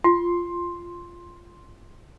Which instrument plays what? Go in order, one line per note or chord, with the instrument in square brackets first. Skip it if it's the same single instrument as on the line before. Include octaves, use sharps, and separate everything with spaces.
[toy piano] F4 [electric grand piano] C6